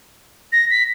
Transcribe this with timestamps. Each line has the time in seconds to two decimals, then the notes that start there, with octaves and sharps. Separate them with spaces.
0.52 A#6
0.71 B6